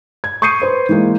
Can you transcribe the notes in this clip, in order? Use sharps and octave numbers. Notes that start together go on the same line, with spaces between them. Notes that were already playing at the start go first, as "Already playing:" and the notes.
G#6
C#6 D#6 G6 C7 C#7 D#7
B4 C5 C6
E3 G#3 A#3